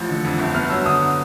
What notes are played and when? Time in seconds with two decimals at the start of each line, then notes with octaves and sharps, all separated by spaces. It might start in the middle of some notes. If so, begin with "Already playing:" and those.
Already playing: A1 F3
0.09 D3
0.25 F2
0.39 G1
0.55 B3 F6
0.70 F#3 E6
0.86 D3 D#6